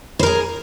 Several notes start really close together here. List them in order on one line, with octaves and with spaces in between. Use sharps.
C5 A#4 G#4